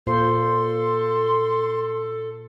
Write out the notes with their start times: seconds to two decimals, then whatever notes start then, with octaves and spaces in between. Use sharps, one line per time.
0.07 A#2 F4 A4 C5 C6